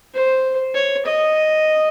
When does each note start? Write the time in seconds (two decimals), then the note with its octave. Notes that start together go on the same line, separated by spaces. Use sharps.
0.14 C5
0.75 C#5
1.06 D#5